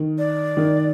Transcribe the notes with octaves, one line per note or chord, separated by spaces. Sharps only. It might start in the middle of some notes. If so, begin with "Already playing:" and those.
Already playing: D#3
D5
D#3